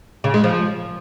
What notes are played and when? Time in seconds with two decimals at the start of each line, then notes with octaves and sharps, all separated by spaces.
0.24 C#3
0.34 G#3
0.44 F3